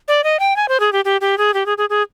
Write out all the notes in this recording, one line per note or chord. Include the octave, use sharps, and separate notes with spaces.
D5
D#5
G5
G#5
C5
G#4
G4
G4
G4
G#4
G4
G#4
G#4
G#4